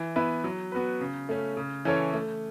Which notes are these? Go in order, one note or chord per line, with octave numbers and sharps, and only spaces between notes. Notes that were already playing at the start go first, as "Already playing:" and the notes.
Already playing: E3
B3 E4 B4
F#3
B3 F#4 B4
C#3
A3 C#4
C#3
E3 C#4 A4 C#5
A3